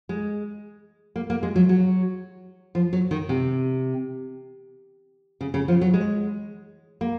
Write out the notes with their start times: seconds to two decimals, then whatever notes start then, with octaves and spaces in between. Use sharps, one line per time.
0.09 G#3
1.16 A#3
1.30 A#3
1.43 G#3
1.56 F#3
1.69 F#3
2.75 F3
2.93 F#3
3.11 D#3
3.29 C3
5.41 C#3
5.54 C#3
5.68 F3
5.81 F#3
5.94 G#3
7.01 A#3